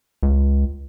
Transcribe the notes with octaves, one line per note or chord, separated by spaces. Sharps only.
C#2